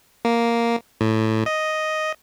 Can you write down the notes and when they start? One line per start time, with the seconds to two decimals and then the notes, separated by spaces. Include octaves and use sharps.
0.25 A#3
1.01 A2
1.46 D#5